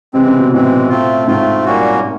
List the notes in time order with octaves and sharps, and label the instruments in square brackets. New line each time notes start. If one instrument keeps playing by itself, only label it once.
[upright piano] C3 [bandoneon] E3 G#3 C4
[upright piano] C#3
B2
[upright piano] A2 [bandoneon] E3 G#3 C4
[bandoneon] A3 C4 F4
[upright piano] G#2 [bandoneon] A3 C4 F4
[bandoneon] A#2 G3 A#3 C#4 F#4